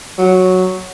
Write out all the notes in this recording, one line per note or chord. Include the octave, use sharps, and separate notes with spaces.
F#3